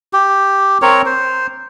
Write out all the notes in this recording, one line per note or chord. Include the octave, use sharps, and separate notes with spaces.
G4
C4 A#4 C#5
C5